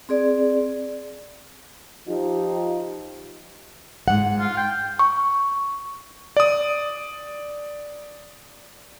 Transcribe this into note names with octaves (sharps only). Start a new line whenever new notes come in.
C4 G#4 D5
F3 D#4 F4 G4
G#2 F#5
F4
G5
C#6
D5 D#6